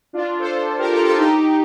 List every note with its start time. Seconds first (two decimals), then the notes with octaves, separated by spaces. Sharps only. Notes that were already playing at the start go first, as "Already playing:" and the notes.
0.13 D4 F4
0.39 A4 C5
0.79 G4 A#4
0.92 F4 A4
1.05 F4 A4
1.17 D#4 G4